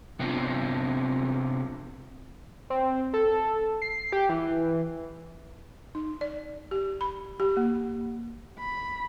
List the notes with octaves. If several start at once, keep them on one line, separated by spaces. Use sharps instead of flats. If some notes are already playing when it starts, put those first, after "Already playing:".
C3 B3 C4 D4 F4
C4
A4
C7
G4
E3
D#4
D5
G4
B5
G4
A#3
B5